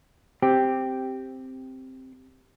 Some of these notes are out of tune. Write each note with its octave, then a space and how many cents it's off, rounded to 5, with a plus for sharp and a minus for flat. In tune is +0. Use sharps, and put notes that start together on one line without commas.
C4 +0 G4 +0